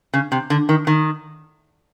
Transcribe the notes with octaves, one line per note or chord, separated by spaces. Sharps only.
C#3
C3
D3
D#3
D#3